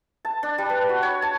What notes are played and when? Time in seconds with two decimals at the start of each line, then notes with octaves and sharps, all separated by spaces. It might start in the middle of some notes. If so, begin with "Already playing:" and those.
0.25 A5
0.43 D4
0.58 G3
0.69 B4
0.89 F#4
1.02 C#5
1.22 A5